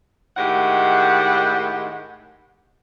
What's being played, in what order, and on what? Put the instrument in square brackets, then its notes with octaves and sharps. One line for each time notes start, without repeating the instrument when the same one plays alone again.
[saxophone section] A2 D#3 G#3 G4 F#5